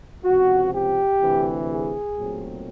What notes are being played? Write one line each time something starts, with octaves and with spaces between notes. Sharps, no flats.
C#2 C3 F3 F#4
G4
D2 C3 E3
G#4
B1 A#2 F#3 A3 C4